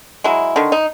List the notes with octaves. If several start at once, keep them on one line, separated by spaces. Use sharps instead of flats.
F#3 G#3 E4
D3 D#3
D#4